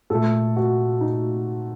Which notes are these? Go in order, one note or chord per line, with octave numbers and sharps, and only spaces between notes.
A#2 A3 A4
F#4
D#4